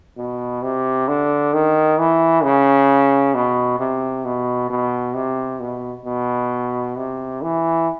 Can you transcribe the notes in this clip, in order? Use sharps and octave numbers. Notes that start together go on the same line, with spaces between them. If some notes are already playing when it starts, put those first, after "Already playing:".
B2
C3
D3
D#3
E3
C#3
B2
C3
B2
B2
C3
B2
B2
C3
E3